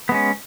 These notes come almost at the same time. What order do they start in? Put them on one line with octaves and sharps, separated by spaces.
B3 G#3 C#4